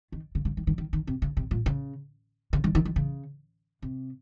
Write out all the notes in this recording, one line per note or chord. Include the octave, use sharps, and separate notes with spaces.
D#3
C#3
C#3
D#3
D#3
D#3
D#3
C3
C#3
C3
A#2
C#3
C#3
D#3
D#3
D#3
C#3
C3